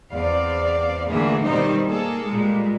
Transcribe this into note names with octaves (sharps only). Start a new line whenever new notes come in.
E2 C4 D5 F5
A#2 D3 E3 A3 A#3 G#4
B2 D#3 G3 C4 D#4 C5
A#3 G#4 A4
A#2 G3 G#3